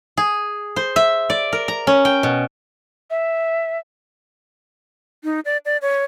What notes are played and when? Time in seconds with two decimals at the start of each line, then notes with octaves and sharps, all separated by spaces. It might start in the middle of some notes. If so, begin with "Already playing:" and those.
0.17 G#4
0.76 C5
0.96 E5
1.30 D5
1.53 A#4
1.68 A#5
1.87 C#4
2.05 G5
2.23 B2
3.10 E5
5.24 D#4
5.45 D5
5.65 D5
5.82 C#5